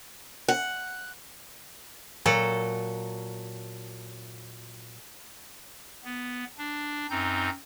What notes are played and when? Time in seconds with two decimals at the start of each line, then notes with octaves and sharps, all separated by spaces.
0.48 F#5
2.26 A#2 F#3 A4
6.04 B3
6.58 D4
7.10 F#2 C4 D#4 G6